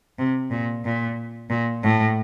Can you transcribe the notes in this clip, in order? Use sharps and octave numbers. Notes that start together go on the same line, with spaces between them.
C3
A#2
A#2
A#2
A2